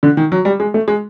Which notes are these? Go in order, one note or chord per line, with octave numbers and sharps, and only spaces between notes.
D3
D#3
F#3
G3
G#3
A3
G#3